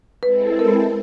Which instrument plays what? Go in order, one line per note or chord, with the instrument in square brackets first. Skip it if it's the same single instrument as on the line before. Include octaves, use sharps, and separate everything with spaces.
[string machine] G#3 C4 E4 A4 [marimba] B4
[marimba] A#4